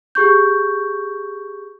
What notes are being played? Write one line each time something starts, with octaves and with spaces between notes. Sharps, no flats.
G4 G#4 C#6 G6